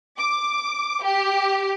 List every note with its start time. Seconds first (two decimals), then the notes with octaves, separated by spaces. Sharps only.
0.18 D6
1.04 G4